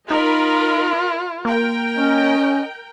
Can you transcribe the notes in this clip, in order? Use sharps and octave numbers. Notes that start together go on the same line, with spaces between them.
D#4 F4 A#4 D#5 B5
A#3 A#4 G5
C#4 D#5